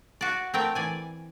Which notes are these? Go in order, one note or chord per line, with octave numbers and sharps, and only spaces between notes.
F#4 D5
A3 C4 A#4 G5
E3 D5 G#5